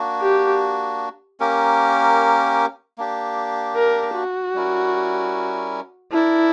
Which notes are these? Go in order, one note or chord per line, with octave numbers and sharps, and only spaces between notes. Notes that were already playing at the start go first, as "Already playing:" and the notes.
Already playing: A#3 D4 F#4
G4
A#3 C#4 G4 A#4
A#3 D4 G4
A#4
F#4
G3 C#4 E4 A#4
D4 E4 A#4 D5